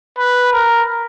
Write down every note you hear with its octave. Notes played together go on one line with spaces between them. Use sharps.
B4
A#4